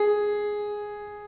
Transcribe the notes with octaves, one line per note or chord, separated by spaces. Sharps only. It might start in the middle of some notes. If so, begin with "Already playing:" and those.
Already playing: G#4